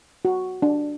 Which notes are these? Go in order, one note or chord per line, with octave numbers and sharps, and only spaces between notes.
F#4
D4